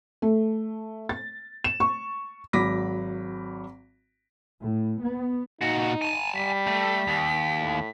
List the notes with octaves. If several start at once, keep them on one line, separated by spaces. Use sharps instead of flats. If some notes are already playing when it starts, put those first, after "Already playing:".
A3
A6
E7
C#6
G#1 F#3 B5 D6 A#6 B6
A2
B3
A#2 D#4 F#4
G#5 A5 D#7
G3 B6
A3
D#2
A2